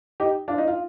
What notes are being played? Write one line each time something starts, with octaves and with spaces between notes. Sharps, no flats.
D#4 G4
D4 F4
D#4
F4